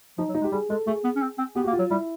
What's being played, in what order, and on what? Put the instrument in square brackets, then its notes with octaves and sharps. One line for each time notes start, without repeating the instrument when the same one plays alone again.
[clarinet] F3 [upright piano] D#4
[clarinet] F#3
[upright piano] D#4
[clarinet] G#3
[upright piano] G4
[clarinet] G3 [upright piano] G#4
[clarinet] G#3 [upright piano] A4
[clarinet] A3 [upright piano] G#4
[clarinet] B3
C#4
C4
C4
[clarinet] B3 [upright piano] G4
[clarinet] A#3 [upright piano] F#4
[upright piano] F4
[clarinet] F#3
[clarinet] G3 [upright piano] E4